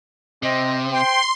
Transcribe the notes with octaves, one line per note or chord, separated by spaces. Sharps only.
C3 C4 D#5
C5 G5 C6